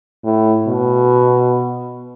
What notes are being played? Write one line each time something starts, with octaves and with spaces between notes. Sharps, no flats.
A2
B2